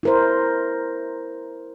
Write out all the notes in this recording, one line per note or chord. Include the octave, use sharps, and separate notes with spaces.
E4 A#4 C5